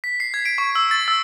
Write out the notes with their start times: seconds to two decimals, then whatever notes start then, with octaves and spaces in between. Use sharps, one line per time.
0.04 B6
0.20 C7
0.34 G#6
0.45 D7
0.58 C#6
0.75 E6
0.91 A6
1.08 E6